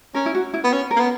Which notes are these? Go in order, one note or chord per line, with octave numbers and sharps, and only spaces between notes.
C#4 A#4
E4
F#4
E4
B3
C#4
A#4
A#3
B3